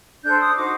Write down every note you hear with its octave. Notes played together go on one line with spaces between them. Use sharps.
D4 A4 C5 G6
D#6
D#4 F#4 C5 D6